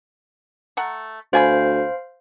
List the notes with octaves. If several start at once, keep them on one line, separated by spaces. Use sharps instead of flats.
A3 F#5 A#5
D2 B3 C5 F5 G#5 B5